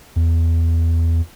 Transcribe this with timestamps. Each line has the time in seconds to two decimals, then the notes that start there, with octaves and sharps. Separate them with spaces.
0.16 E2